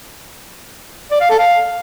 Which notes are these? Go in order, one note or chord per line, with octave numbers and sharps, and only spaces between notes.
D5
F5
A4
F5